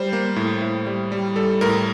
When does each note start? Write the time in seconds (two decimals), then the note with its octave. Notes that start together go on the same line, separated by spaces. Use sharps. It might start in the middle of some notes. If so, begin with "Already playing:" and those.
Already playing: G3 C5
0.13 A#3
0.36 A2
0.62 A2
0.87 G3
1.12 G3
1.36 G3 A4
1.61 A2 A#4